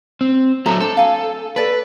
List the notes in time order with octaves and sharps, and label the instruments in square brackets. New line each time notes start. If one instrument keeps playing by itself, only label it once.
[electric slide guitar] C4
[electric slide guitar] F#3 A3 A4 [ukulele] A#5
[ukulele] D4 C5 [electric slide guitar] A4
[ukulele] F5 G#5
[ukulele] A4 D5 A5 [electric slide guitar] B4